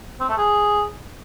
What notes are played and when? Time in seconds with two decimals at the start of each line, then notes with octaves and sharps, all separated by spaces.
0.20 C4
0.29 A3
0.37 G#4